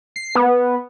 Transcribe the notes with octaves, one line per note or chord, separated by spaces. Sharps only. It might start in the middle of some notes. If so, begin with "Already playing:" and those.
C7
B3